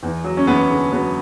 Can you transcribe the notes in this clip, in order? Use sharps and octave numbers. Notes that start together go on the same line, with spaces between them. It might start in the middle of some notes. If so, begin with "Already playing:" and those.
E2
F#3
C#4
E2 B3
D3
F#3 B3